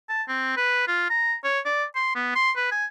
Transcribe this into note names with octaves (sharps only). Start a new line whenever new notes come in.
A5
C4
B4
F4
A#5
C#5
D5
C6
B3
C6
B4
G#5